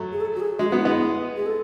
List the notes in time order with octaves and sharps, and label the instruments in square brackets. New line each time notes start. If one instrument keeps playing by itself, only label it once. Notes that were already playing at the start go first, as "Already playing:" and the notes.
Already playing: [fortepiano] F#3 A3
[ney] G#4
A4
F#4
G#4
[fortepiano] G#3 [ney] F#4
[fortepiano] G#3 B3 [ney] F#4
[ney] E4
[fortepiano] G#3 B3
[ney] G#4
A4